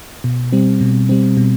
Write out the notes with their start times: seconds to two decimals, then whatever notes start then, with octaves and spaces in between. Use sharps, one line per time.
0.24 B2
0.52 G3 C4
0.81 B2
1.09 G3 C4
1.37 B2